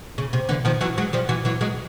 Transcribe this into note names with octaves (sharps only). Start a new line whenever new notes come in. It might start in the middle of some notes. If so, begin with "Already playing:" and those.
C#3
C3
D3 E3
D#3 F3
E3 F#3
F#3 G#3
F3 G3
E3 F#3
E3 F#3
F#3 G#3